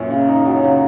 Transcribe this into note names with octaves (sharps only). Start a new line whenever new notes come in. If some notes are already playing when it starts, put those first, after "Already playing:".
Already playing: F#2 A#2 E3 A#3 C#4
C#3
D#4
F#3
C#3